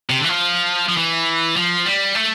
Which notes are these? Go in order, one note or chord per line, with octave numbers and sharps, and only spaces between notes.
C3
D3
E3
F3
F3
E3
F3
G3
A3